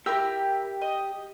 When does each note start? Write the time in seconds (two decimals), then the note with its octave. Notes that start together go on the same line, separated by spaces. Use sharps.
0.06 E4 G4 A#4 G5 E6
0.81 D#5